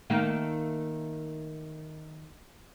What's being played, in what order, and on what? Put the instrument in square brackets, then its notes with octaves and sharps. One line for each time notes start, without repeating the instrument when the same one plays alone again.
[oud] D#3 A3 A#3